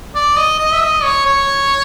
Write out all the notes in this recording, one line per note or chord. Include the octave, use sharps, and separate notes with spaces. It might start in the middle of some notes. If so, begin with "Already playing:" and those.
D5
D#5
D#5
E5
D#5
C#5
C#5